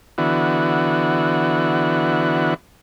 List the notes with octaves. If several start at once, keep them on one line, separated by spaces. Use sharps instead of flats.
D3 E3 B3 F#4